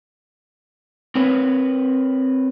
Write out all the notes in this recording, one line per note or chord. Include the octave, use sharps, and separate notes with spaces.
C4 A#4 B4 C#5